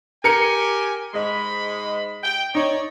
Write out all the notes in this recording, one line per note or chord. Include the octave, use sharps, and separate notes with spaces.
G4 A#4 G#5 C#7
G#2 G#3 D#5 B5
G5
D#4 C#5 D5